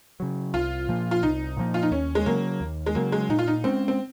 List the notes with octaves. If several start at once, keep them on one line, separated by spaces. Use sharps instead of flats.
C#3 F#3
C2 F4
A#2 F3 A#3
F4
C2 D#4
A#2 F3 A#3
F4
D#4
D#2 C#4
G#3
C#3 F#3 A#3
D#2
G#3
C#3 F#3 A#3
G#3
A#2 D#4
F4
D#4
G#3 C4 C#4
C4